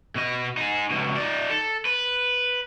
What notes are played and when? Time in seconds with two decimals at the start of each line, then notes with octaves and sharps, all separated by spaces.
0.15 B2 D#5
0.57 D#4 G#4
0.90 C#2 B2
1.16 D#4 D5
1.49 A4
1.85 B4